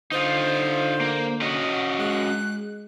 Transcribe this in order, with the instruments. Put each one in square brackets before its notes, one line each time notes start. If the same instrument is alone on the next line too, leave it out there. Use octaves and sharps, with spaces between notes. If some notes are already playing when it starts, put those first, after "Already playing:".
[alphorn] D3 [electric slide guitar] D#4 F4 [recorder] C5
[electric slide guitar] A#3
C#4 F#4 D#5
[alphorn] G#3 [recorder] F#6